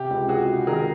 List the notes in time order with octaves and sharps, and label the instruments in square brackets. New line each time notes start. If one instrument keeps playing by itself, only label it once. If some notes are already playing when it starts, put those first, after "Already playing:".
Already playing: [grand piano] C3 [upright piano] G4
[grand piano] C#2
[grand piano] C#2 [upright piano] F#4 G#4
[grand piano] C3
[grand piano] D#3 [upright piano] G#4 A#4